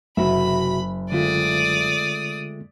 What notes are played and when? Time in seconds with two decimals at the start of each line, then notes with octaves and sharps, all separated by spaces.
0.17 F#1 C3 F#4 E5 B5
1.12 D3 G#3 A3 C4 F4 D5 D#6